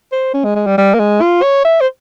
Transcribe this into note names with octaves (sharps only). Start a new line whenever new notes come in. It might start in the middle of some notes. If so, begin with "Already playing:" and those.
C5
C#4
G#3
G#3
G3
G3
A#3
G#3
F4
C#5
E5
C5